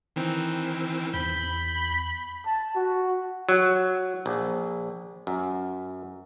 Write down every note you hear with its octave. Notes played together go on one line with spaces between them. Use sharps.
D#3 E3 C4
E2 B5 G6
A5
F#4
F#3
A#1
F#2